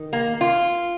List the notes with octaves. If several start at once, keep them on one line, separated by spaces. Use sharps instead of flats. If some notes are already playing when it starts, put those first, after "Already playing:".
Already playing: D#3
A#3
F4